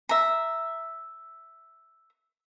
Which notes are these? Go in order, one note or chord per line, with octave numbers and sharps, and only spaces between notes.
E5 A#5